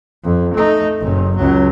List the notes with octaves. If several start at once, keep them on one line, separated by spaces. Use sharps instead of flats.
F2
A3 D#4
F#1 C#4
C#2 F#3